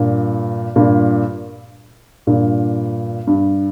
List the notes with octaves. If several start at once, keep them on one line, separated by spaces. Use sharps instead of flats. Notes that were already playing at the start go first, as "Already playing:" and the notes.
Already playing: G2 A#2
G2 A#2
G2 A#2
G2